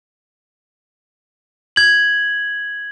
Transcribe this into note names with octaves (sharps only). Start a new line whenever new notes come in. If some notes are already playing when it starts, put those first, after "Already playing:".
G#6 F#7